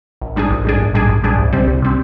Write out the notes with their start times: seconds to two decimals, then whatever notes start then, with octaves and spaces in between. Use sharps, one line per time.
0.22 A#1
0.36 G#2 G3 D4 G#4
0.50 A#1
0.65 G#2 G3 D4 G#4
0.81 A#1
0.94 G#2 G3 D4 G#4
1.09 A#1
1.24 G#2 G3 D4 G#4
1.38 C2
1.53 C3 G3 C4
1.67 C2
1.82 C3 G3 C4